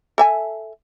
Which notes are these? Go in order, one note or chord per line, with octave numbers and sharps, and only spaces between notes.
A4 E5 G#5